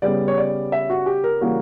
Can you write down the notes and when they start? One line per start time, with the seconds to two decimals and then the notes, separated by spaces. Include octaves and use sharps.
0.02 C#3 G3 B3 D5
0.28 C#5
0.38 D5
0.72 E5
0.90 F#4
1.06 G4
1.24 A#4
1.41 C#3 E3 G3 A#3 F#4